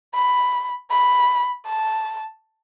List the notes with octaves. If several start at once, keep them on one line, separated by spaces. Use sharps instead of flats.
B5
B5
A5